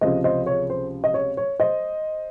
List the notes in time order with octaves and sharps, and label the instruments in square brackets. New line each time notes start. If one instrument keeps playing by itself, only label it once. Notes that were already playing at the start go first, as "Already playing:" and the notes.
[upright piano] C#2 C3 F3 C5 D#5
C5 D#5
C#5
C5
D#5
C#5
C#5
C5 D#5